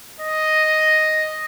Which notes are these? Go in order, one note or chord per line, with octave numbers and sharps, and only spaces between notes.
D#5